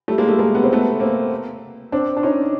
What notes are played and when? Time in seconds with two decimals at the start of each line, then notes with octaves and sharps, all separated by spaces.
0.08 G3 A3
0.18 G#3 A#3
0.29 G3 A3
0.39 G#3 A#3
0.55 B3
0.63 C4
0.73 A3 B3
1.00 A#3 C4
1.92 C4 D4
2.17 D4
2.23 C#4 D#4